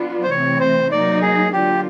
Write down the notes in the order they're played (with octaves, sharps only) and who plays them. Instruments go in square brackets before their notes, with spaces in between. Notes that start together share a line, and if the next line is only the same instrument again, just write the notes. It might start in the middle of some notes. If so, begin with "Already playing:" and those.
Already playing: [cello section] F#3 B3 D4 F4
[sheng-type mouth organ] C5
[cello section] C3 E3 A3 C4 [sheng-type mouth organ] C#5
[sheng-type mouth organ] C5
[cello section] F#3 A#3 D#4 [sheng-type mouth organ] D5
[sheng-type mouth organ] G#4
[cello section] D3 F#3 A#3 D4 F4 [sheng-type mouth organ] G4